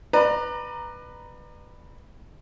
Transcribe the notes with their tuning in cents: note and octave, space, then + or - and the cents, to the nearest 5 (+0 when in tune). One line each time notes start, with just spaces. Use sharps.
B4 +0 D5 +35 A#5 +0